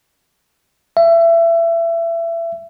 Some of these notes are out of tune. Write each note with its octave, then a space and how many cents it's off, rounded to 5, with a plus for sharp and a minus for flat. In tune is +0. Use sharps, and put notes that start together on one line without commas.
E5 +25